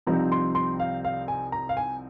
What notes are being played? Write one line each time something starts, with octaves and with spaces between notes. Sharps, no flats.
C2 C3 F3 C4 D#4 A#5
C6
C6
F5
F5
G#5
A#5
F5
G#5